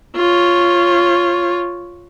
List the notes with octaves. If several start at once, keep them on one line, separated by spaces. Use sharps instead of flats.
F4 C#5